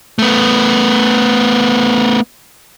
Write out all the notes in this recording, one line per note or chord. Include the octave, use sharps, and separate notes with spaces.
A3 B3